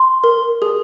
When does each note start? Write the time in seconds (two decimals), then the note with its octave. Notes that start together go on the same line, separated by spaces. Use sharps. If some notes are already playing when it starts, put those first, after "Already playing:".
Already playing: C6
0.24 A#4
0.62 G#4